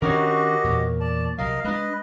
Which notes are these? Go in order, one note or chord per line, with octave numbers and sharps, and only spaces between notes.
D#3 C#4 D4 F#4 G4 A#4 C#5 D#5
E2 A#2
D5 A5
C2 C3 F#3 A#4 D#5 F5
G#3 D4 B4 D#5